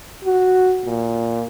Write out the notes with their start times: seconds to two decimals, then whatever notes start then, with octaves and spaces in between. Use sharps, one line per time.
0.25 F#4
0.85 A#2